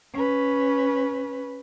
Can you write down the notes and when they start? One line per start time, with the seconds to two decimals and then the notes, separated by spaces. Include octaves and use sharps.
0.13 C#4 B4